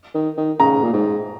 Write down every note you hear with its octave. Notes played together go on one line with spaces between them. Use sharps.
D#3
D#3
C#3 A#5
A#2
G#2